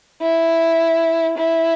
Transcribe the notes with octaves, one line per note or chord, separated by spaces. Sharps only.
E4
E4